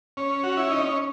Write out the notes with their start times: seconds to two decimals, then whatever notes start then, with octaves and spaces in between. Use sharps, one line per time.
0.17 C#4
0.43 F#4
0.57 E4
0.71 D#4
0.84 C#4